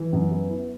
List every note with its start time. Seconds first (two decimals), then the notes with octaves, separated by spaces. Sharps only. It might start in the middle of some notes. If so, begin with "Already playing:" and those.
Already playing: E3
0.13 F#2
0.31 B3
0.50 E4